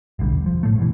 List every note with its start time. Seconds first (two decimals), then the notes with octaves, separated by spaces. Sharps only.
0.19 F1 B1 D3 G3
0.32 E2
0.46 F3
0.63 A2 A3
0.78 G2 B2 E3